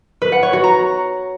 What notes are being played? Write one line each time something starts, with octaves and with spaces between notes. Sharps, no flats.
B4
F#5
C#5
F#4
A#5